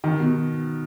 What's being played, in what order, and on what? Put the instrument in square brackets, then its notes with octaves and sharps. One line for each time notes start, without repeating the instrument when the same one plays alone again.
[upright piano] D#3
B2